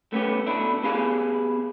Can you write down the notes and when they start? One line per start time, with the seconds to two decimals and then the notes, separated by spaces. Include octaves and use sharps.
0.13 A3 B3 C#4 G4
0.47 B2 A3 D4 E4
0.83 B3 G4 G#4 F5 G#5